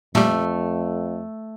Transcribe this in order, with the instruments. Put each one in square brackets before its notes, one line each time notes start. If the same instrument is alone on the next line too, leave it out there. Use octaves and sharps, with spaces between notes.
[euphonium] F2 [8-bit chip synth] A#2 G3 [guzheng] A3